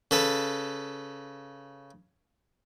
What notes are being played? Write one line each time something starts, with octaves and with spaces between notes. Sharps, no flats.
C#3 A4 B4